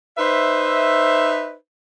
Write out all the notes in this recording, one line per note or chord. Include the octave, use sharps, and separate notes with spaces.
D#4 B4 C5 E5